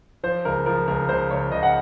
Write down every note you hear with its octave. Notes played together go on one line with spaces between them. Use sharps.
F3 C5
C#2 A#4
F3 A#4
C#2 A#4
C#2 C5
C#2 C#5
C#2 D#5
F#5